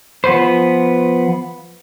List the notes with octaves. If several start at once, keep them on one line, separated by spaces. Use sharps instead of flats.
F3 B3 B4 C5